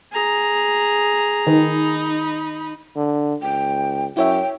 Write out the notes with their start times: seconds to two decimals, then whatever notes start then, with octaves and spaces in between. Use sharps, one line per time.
0.13 G#4 A#5
1.47 D#3 D#4 B5
2.97 D3
3.42 C#2 G5
4.17 F#2 E4 C#5 E5 G5